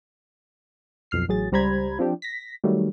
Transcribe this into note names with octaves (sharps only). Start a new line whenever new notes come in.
B1 F2 F6 C7
A1 F#3 G#4 A6
C#2 G3 C5 A#5 B5 G#6
F3 C4 D4 G4
A#6 B6
D#3 F#3 G3 A3